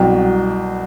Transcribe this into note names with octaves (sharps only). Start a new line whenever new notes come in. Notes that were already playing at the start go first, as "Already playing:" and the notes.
Already playing: C2 B2 F#3 G5